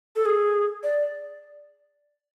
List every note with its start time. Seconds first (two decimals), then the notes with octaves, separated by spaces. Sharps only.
0.16 A4
0.26 G#4
0.83 D5